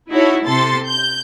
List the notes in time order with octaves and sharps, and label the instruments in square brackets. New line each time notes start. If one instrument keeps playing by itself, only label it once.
[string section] D#4 E4 F#4 A4 C#5
C3 A4 C6 A6
G6